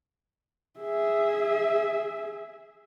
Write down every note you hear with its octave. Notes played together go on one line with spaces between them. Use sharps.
G#4 E5